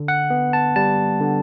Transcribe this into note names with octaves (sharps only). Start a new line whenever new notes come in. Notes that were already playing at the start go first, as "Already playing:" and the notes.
Already playing: D3
F#5
B3
A5
G3 A5
D3